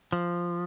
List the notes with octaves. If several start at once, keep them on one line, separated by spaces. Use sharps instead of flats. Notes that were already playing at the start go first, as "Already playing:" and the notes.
F3